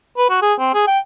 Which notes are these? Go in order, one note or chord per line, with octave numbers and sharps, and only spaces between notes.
B4
F#4
G#4
C4
G#4
G5